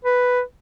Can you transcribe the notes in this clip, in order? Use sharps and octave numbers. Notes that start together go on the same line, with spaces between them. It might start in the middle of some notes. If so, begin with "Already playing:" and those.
B4